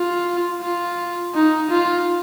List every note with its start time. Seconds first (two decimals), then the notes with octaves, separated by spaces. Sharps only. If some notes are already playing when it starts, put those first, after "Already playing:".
Already playing: F4
0.62 F4
1.35 D#4
1.71 F4